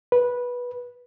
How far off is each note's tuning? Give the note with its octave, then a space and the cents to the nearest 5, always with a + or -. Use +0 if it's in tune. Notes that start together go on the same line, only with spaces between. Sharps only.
B4 -15